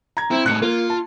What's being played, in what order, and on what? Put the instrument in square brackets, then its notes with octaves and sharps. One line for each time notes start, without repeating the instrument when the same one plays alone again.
[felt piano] A#5 G#6
[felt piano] C4 [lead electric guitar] E4
[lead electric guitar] A2 D#4 [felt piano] F#6 C#7
[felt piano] A#3 [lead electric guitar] F4
[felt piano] A5